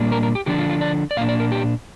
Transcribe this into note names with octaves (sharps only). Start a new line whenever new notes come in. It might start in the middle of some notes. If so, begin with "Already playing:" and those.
Already playing: A#2 G3 A#3 D4
A#4
A#4
G4
D3 F3 D4 G4
F4
F4
D5
D5
A#2 A#3 D4 F5
D5
A#4
G4